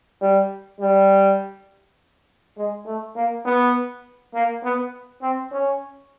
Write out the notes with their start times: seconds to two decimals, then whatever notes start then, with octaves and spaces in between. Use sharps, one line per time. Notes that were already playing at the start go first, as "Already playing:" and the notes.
0.21 G3
0.80 G3
2.57 G#3
2.86 A3
3.16 A#3
3.45 B3
4.34 A#3
4.64 B3
5.22 C4
5.52 C#4